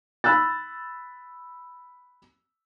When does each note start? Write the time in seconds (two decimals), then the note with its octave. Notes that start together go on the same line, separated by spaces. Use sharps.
0.24 B5 E6 F#6 A6